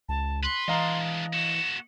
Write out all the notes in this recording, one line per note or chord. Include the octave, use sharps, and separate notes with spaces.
C#2 A5
B4 C6
E3 G#3 D4 D#5 F5 A#5
A#3 F#4 E7